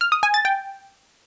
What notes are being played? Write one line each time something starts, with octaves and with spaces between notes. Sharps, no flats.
F6
D#6
G#5
A6
G5